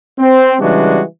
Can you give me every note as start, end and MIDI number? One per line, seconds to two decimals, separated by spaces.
0.19 0.54 60
0.60 1.02 49
0.60 1.02 52
0.60 1.02 55
0.60 1.02 56
0.60 1.02 62
0.60 1.02 66